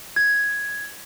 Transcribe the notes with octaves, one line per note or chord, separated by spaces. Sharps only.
G#6